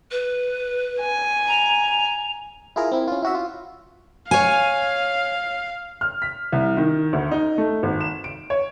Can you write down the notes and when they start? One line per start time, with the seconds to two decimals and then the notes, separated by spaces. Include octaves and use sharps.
0.11 B4
1.00 G#5
1.47 A#5
2.76 E4 F4 G#4 A#4
2.92 C4 E4
3.08 C#4 F4
3.22 E4 F#4 E5
3.35 F4
4.31 C#5 F5 G#5
6.01 F6
6.22 B6
6.52 C2
6.77 D#3
7.13 D2
7.31 D#4
7.58 A3
7.83 G#1
8.01 E7
8.24 D7
8.50 C#5